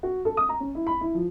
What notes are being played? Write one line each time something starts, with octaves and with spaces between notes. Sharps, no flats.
F#4
A4
D#6
A#5
C#4
E4
B5
E4
F3